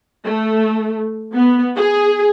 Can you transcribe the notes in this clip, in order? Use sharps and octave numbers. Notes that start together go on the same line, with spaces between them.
A3
B3
G#4